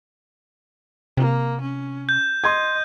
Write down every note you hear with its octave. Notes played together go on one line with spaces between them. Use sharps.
C3 A#3
C#4
G6
D#5 C6 G#6